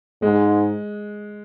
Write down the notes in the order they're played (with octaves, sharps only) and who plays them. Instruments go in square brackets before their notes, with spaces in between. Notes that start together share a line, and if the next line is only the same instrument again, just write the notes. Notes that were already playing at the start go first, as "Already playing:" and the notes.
[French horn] G#2 [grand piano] G#3